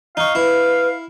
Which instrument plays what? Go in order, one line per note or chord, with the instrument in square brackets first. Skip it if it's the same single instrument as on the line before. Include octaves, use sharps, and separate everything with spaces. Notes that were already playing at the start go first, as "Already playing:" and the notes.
[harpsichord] D#4 C#6 [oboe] F5
[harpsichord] E4 [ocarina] B4